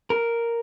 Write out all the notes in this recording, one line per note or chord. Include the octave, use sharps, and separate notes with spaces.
A#4